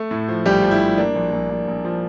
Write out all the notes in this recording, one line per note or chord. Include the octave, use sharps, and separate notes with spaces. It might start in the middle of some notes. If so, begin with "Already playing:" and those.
Already playing: A3
A2
F3
A#1 G3 G4
F3
E4
F3
A#3 D4
A#1
A#1
A#1
A#1
F3